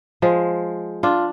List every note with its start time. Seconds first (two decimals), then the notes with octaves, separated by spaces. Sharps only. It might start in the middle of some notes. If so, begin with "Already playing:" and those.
0.22 F3 G#3
1.03 D4 F4